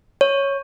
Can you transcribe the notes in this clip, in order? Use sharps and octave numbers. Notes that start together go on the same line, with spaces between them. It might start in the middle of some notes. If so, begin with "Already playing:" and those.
C#5